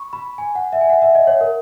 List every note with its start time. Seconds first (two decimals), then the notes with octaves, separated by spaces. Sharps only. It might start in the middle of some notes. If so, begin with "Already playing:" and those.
Already playing: B5 C#6
0.13 B5
0.38 G#5
0.55 F#5
0.73 E5
0.81 G#5
0.89 F#5
1.02 E5
1.15 D#5
1.27 C#5
1.41 A#4